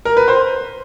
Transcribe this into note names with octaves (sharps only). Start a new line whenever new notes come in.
A#4
B4
C5